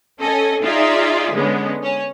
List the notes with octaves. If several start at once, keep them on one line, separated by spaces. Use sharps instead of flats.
C#4 A4 D#5 G#5
D#4 F4 G#4 D5 E5
D3 G#3 B3 C#4
C#4